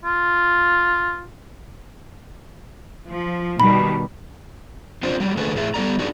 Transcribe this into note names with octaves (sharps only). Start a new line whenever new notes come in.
F4
F3
B2 D#3 G3 B5
C4 D4 D#4 F4 C5
F#3 G3
D3 A3 D4 G#4 A4 B4
A2 G#4 E5
G3 B3 A4 D5 A#5
D4 D#4 F#4 G#4